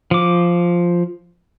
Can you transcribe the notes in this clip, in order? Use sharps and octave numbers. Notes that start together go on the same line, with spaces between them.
F3 D6